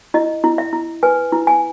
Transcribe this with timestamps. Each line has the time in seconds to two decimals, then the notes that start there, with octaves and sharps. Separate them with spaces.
0.14 E4 D#5
0.44 E4
0.58 E5
0.73 E4
1.03 B4 G#5
1.32 E4
1.47 G#5